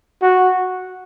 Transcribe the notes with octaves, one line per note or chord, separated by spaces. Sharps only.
F#4